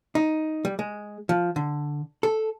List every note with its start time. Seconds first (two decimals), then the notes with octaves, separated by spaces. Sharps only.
0.15 D#4
0.65 G3
0.79 G#3
1.29 F3
1.56 D3
2.23 A4